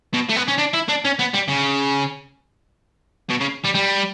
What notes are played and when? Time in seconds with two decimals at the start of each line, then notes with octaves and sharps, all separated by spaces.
0.14 B2
0.30 A3
0.36 B3
0.48 C#4
0.59 D4
0.74 E4
0.89 D4
1.05 C#4
1.20 B3
1.35 G3
1.49 C#3
3.30 B2
3.41 C#3
3.65 G3
3.75 G3